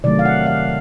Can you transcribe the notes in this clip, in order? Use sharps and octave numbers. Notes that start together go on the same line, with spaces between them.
C3 D#3 F#3 A3 D5
F5
F#5
F5